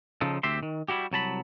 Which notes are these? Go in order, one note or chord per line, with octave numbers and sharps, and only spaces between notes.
C#3 F3 D#4 A4
D2 C4 G4 E5 C6
D#3
G3 E4 F#4 G4
C2 F#3 A5 B5